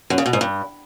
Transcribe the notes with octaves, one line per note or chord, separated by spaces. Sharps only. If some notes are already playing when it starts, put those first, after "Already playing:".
F#2
C#3
B2
G#2
G2